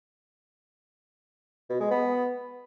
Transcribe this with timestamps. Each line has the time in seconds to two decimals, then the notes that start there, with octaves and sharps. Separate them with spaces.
1.70 B2
1.80 G#3
1.91 B3